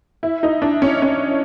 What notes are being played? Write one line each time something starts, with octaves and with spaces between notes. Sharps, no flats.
E4
D#4
D4
C#4
C#4